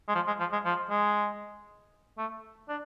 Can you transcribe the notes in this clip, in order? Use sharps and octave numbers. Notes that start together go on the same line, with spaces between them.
G#3
F3
G#3
F3
G#3
F3
G#3
A3
D4